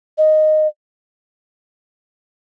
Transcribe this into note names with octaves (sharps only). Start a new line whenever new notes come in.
D#5